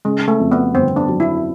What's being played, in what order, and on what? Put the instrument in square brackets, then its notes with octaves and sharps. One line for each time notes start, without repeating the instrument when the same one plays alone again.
[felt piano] C#3 [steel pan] G#3
[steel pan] A3
[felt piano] F2
[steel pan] B3
[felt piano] G1 [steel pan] C4
[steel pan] D4
[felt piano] F#3
[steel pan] E4